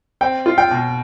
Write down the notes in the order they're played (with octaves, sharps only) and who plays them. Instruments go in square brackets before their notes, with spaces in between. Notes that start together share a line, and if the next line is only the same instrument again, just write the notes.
[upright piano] C4 [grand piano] G5
[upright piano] F4
[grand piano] G5
[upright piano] B2